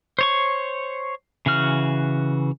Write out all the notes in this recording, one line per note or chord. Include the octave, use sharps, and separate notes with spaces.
C5 C#5 C#6
C#3 E3 F#4 F6